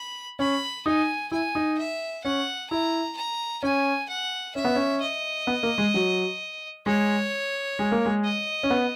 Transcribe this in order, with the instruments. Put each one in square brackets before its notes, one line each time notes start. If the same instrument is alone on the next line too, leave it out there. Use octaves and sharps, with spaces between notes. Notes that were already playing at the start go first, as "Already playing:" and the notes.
Already playing: [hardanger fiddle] B5
[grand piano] C#4 [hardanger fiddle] B5
[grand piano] D#4 [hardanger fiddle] G#5
[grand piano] E4 [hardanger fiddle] G#5
[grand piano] D#4
[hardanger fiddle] E5
[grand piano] C#4 [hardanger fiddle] F#5
[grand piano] E4 [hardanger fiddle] A#5
[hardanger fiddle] A#5
[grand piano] C#4 [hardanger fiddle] G#5
[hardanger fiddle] F#5
[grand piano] C#4 [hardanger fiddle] E5
[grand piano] B3
C#4
[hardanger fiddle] D#5
[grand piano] B3
A#3
G#3
F#3
[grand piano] G#3 [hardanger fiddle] C#5
[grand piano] G#3
A#3
G#3
[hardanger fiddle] D#5
[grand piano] C#4
B3